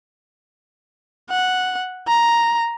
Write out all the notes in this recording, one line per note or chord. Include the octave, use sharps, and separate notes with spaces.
F#5
A#5